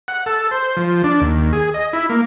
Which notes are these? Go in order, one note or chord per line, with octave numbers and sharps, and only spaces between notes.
F#5
A4
C5
F3
D4
D#2
G#4
D#5
E4
A#3